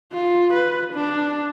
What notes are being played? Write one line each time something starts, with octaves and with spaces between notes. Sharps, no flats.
F4
B4
D4